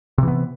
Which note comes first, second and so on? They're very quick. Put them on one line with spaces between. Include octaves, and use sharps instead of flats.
C3 E3 B3